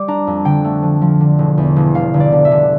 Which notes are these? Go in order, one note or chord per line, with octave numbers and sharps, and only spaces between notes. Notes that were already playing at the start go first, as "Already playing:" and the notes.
Already playing: G3 D6
D4 A#5
F2
D3 G5
A3
F3
F3
D3
E1
E2
E1
G1 F5
G1
D5
D3
E5
D3